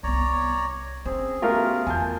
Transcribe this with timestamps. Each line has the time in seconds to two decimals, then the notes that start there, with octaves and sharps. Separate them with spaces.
0.03 C2 B3 C#5 D5 A#5
1.06 C4 C#4 G#4
1.42 B2 A3 F4 G4 A#4
1.87 E2 G#5 A5 G6